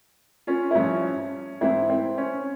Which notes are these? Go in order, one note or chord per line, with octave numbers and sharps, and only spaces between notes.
C#4 F4
E4
G2 F3 C#4
G#2 E3 C4 E4
C4
C#4